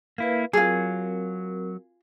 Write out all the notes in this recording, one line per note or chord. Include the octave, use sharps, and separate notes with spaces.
A#3 E4 B4 F5
F#3 C4 F4 F#4 G#4 A#4